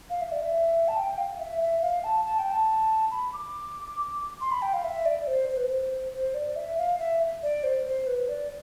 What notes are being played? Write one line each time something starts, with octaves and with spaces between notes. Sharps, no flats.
F5
E5
D5
E5
A5
G5
F5
E5
E5
F5
A5
A5
G5
A5
B5
D6
C6
B5
G5
F5
E5
D5
C5
C5
B4
C5
C5
D5
E5
F5
E5
D5
C5
C5
B4
D5